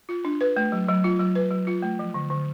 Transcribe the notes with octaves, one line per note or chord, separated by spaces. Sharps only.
F4
D4
B4
A3
F#3
F#3
F4
F#3
B4
F#3
F4
A3
F3
D3
D3